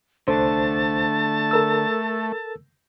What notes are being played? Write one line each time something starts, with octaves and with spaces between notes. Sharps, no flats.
C2 D3 A3 C5 A5
A4 A#4 E6